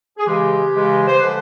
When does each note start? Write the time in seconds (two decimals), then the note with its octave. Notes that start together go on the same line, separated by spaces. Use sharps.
0.18 G#4
0.26 C#3 E3 G#3 G4
0.72 C#3 E3 G#3
1.08 C5
1.18 D3 F3 G#3 B4